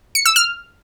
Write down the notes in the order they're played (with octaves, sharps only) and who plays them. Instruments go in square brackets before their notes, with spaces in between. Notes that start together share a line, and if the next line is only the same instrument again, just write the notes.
[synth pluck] C#7
E6
F6